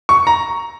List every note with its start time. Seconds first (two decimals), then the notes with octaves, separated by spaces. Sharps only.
0.09 C#6
0.27 A#5